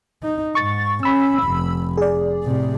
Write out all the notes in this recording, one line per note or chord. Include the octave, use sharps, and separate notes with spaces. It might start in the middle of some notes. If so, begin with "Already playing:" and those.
D#4
G#2 C#6 A6
C#4 B5 E6
F1
G#4 D5
A2 C3